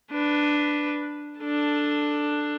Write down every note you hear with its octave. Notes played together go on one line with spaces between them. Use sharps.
D4 B4
D4 A4